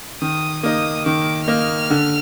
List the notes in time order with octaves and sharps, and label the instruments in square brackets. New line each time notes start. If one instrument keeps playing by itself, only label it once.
[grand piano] D#3 [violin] D#6
[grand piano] A#3 D#4 [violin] D#6
[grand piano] D#3 [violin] D6
[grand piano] A#3 D#4 [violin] F6
[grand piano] D3